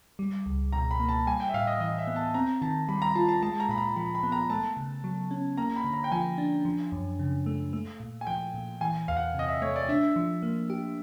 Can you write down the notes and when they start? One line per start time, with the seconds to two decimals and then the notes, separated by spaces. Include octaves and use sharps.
0.19 G3
0.46 C#2
0.72 B2 A#5
0.91 B5
1.00 A#3
1.09 A5
1.27 G3 G#5
1.40 G5
1.49 E5
1.54 A2 F5
1.67 D#5
1.80 E3 D#5
1.98 E5
2.07 B3
2.16 A5
2.34 C4 A#5
2.62 D#3 A5
2.88 G3 B5
3.02 A#5
3.15 F4 A5
3.29 A5
3.43 G#3 A5
3.60 A#5
3.69 A#2 B5
3.78 A#5
3.96 F3 B5
4.15 B5
4.23 B3
4.32 A#5
4.50 A3 A5
4.77 C#3
5.04 F#3
5.31 C#4
5.58 A#3 A#5
5.76 B5
5.84 D3
5.93 A#5
6.04 G5
6.11 F3 G#5
6.38 D4
6.65 F3
6.92 F#2
7.19 C#3
7.46 A3
7.73 A3
8.00 A#2
8.21 G#5
8.27 F3 G5
8.54 A#2
8.81 E3 G#5
9.08 E2 F5
9.17 F#5
9.35 C3 D#5
9.48 E5
9.62 A3 C#5
9.76 D5
9.89 D4 E5
10.16 F3
10.42 A#3
10.70 G4